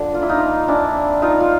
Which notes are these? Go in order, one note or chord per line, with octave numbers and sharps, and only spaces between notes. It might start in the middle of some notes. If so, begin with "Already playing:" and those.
Already playing: D3 F3 D4
A#3 F4
E4
D#4 F4
F3
E3 D4 E4
C4
E3 D#4 F4
F4